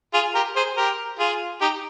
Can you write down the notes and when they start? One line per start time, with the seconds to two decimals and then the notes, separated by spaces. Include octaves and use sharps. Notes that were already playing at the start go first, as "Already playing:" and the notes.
0.14 F4 G#4
0.35 G4 A#4
0.56 G#4 C5
0.77 G4 A#4
1.19 F4 G#4
1.61 D#4 G4